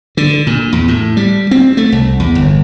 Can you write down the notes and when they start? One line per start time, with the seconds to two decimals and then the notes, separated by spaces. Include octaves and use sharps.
0.17 D3
0.47 A#2
0.73 E2
0.88 A2
1.17 G3
1.51 C4
1.77 A3
1.92 C2
2.20 E2
2.35 G1